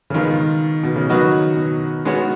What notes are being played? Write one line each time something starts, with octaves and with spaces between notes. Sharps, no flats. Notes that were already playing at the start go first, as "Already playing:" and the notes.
C#3
B2 D#3 G#3 B3 F4 A#4
B2
C#3
D#3 F#3 B3 F#4 B4 D#5
B2
D#3 G#3 B3 F#4 C#5